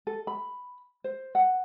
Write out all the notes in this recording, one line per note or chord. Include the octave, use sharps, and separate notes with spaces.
A4
B5
C5
F#5